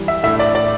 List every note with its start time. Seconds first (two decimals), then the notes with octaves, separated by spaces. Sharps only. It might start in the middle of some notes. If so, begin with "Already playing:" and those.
Already playing: E3 G3
0.08 E5
0.23 A2 A3 D4 E5
0.39 D5
0.55 D5